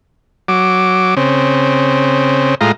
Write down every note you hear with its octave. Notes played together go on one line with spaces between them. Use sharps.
F#3 D6
C#3 C4
A2 G#3 F4 A#5